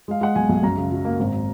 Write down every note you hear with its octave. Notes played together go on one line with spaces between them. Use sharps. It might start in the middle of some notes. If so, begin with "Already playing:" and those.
G#3 F5
G#3 F#5
B1 G#5
B1
F#2 A#5
C#3
F#3
A#3
G#1